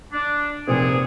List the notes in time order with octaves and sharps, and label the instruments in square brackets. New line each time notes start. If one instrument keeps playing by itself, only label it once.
[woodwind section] D4
[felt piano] F1 C4 [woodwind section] A#2 G#4